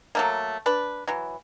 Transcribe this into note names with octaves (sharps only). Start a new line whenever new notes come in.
F#3 A3 A#3
D4 B4
E3 F#3